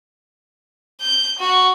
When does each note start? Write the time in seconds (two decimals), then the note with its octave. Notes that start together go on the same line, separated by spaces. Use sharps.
1.01 G6
1.39 F#4